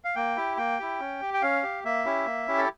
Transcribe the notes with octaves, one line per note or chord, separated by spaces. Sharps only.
F5
A#3 G5
E4 G4
A#3 G5
E4 G4
C#4
G4
G5
C#4 F5
G4
A#3 E5
C#4 E4 G4
A#3
C#4 E4 G4
A4